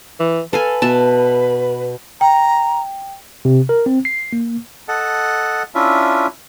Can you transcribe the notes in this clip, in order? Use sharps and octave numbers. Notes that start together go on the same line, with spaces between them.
E3
A4 B4 F5 G#5
B2 E5 A5
G5 A#5
C3
A#4
C4
C7
A#3
A4 D#5 F#5 A5
C#4 D4 E4 F4 E5